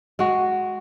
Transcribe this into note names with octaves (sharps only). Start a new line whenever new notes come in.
G#3 F#4